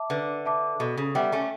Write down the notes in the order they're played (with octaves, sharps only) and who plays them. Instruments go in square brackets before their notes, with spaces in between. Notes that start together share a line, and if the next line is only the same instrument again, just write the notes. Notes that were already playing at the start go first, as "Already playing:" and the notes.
Already playing: [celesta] E5 A5 D6
[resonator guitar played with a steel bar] D3 [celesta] B4
[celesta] E5 A5 D6
[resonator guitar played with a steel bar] B2 [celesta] A4
[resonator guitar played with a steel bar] C#3
[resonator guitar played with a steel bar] G3 B3 [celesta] E5 G5
[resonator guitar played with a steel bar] A3 C#4